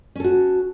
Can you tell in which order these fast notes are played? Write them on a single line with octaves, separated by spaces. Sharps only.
C#4 A4 F#4